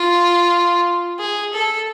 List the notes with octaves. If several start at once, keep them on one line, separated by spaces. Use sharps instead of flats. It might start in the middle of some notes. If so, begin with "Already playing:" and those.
Already playing: F4
G#4
A4